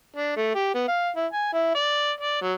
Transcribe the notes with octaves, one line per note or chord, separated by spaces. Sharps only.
D4
A3
G4
B3
F5
E4
G#5
E4
D5
D5
F#3